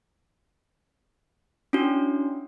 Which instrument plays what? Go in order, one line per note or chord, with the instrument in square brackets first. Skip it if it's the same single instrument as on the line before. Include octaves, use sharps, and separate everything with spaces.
[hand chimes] C#4 D4 E4 F#4